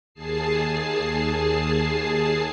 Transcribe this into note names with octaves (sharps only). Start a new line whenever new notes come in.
D#2 G#4 A5 C7